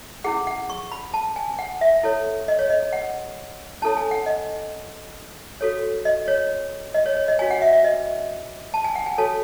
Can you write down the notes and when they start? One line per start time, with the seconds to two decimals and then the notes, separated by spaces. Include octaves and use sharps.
0.24 C#4 E4 G#4 F#5
0.47 F#5
0.70 C#6
0.92 B5
1.14 A5
1.36 G#5
1.59 F#5
1.81 E5
2.03 E4 A4 C#5
2.48 D#5
2.59 C#5
2.70 D#5
2.93 F#5
3.82 C#4 E4 A4 C#5 A5
3.97 G#5
4.11 F#5
4.26 D#5
5.61 F#4 A4 C#5
6.05 D#5
6.28 C#5
6.94 D#5
7.06 C#5
7.17 C#5
7.28 D#5
7.39 C#4 F#4 C#5 G#5
7.51 F#5
7.62 E5
7.73 E5
7.84 D#5
8.74 A5
8.84 G#5
8.96 F#5
9.06 G#5
9.18 F#4 A4 C#5 A5